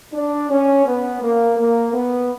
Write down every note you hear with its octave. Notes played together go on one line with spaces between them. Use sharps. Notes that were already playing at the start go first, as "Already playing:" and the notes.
D4
C#4
B3
A#3
A#3
B3